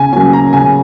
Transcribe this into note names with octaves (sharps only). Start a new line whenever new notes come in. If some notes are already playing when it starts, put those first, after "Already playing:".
Already playing: C#3 G#5
F#3 A#3 C#4 G#5
A#5
C#3 G#5